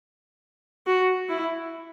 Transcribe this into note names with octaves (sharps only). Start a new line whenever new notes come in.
F#4
E4